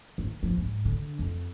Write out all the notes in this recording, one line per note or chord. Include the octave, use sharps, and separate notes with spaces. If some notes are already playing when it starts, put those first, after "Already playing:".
D#3
F3
G#2
D3
F2